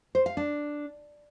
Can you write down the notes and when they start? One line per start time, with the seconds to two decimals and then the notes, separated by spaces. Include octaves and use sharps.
0.15 C5
0.26 F5
0.37 D4